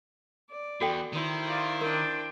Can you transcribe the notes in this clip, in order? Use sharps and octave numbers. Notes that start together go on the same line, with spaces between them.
D5
E2 F#4 A4 G5
D#3 E4 C5
F4 D5
D4 A#4 G5